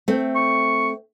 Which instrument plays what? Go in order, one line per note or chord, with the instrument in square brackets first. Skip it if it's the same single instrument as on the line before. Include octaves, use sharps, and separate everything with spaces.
[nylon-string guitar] A3 C4
[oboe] C#6